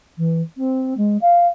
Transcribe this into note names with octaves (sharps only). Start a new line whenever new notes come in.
E3
C4
G#3
F5